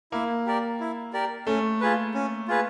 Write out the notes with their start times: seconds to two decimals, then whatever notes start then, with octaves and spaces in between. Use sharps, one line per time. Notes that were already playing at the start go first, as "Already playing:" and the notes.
0.12 A#3 E4
0.46 G4 A#4 D5
0.80 E4
1.13 G4 A#4 D5
1.47 A3 C#4
1.81 F4 G#4 B4
2.14 C#4
2.48 F4 G#4 B4